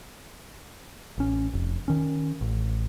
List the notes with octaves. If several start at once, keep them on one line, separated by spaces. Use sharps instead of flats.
A1 C#4
F1
D#3 C#4
A1